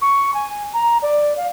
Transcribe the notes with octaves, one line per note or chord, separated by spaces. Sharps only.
C#6
G#5
A#5
D5
F5